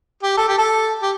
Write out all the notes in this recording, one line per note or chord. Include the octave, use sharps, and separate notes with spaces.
G4
A4
G4
A4
G4